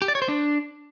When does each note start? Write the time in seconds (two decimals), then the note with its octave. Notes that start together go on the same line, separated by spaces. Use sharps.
0.02 G4
0.08 D5
0.15 C#5
0.22 C5
0.28 D4